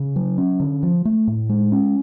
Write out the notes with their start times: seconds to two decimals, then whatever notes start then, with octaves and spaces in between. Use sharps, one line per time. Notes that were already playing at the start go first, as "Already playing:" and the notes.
Already playing: C#3
0.16 F#3
0.38 C#4
0.60 D3
0.83 F3
1.05 A3
1.27 A2
1.49 G#3
1.72 C#4